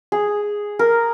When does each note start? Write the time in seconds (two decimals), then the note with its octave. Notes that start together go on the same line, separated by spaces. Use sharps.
0.12 G#4
0.79 A#4